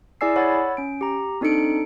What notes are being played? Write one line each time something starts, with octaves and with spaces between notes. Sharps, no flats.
E4 G#4 D5 G#5 E6 C7
C#5 F#5 B5 E6 A6
C#4 D7
G4 A#5
C4 D4 D#4 A4 C#7 D7